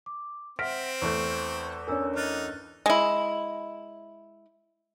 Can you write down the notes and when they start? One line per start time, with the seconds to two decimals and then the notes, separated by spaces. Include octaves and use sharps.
0.06 D6
0.59 C4 E5 F#5 F6 A#6 B6 D7
1.02 E2 A3 C#6
1.88 C#4 D4 A#4 G#5 E6
2.16 D#4 F6 F#6 A6
2.86 G#3 E4